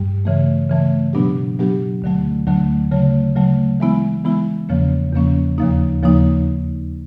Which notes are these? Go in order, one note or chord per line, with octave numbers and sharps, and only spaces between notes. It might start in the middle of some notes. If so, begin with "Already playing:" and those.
Already playing: G2 G3
C#3 E3 A3
C#3 E3 A3
B2 F#3 B3 D4 G4
B2 F#3 B3 D4 G4
D2 D3 F#3 A3
D2 D3 F#3 A3
C#3 F#3 A3
C#3 F#3 A3
E3 G#3 B3 E4
E3 G#3 B3 E4
E2 C#3 F3 A#3 C#4
E2 C#3 F3 A#3 C#4
D#2 C#3 F3 A#3 D#4
D#2 C#3 F3 A#3 D#4